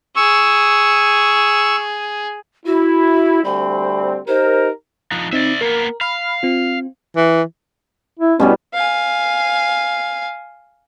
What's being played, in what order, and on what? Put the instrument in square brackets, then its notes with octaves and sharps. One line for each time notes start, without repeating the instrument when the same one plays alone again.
[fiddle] G#4 [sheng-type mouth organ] C#6 E6
[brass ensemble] E4 [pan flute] F#4
[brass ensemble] D2 G3 C4 [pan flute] B5
[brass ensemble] D#4 G4 A#4 [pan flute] C5
[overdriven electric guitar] F3 D#4 [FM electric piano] F#6
[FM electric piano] C4 D#4 [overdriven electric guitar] D5 E5
[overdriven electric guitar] A#3 B3 [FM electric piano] A#4
[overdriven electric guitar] F5 [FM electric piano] B5 F6
[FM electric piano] C4 F4
[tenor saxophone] E3
[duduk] E4
[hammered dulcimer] B2 G3 B3 [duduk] C#4
[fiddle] F5 G#5